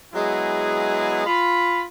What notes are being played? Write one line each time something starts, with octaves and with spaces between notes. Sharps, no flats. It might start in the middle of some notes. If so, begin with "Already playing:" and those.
F#3 G#3 B3 E4 G#4
F4 B5